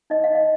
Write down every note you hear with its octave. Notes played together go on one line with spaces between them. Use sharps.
D#4 D#5
F5
D#4 D#5